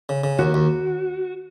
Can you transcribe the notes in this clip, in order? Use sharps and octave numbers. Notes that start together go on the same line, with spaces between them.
C#3
C#3
D#2 F#4
D#2